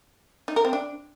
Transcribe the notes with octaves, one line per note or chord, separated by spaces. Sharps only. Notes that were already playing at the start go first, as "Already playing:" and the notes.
D#4
A#4
C4
D4